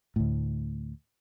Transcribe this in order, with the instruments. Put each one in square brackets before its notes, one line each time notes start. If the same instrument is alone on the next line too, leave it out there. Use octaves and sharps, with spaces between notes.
[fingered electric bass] D2 A2